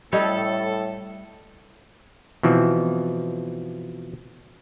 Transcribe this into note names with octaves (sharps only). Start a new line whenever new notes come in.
A2 G3 C#4 A4 C#5 D#5
B2 E3 F3 C4